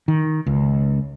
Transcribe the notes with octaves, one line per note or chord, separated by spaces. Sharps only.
D#3
C#2